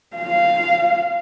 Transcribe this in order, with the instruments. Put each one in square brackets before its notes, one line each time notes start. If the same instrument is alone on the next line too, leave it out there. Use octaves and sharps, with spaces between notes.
[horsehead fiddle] F5